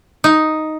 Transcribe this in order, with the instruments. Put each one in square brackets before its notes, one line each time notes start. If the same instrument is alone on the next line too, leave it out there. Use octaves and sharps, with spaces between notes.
[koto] D#4